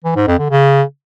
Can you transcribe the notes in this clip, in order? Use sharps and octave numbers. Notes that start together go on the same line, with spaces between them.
E3
G#2
F2
D3
C#3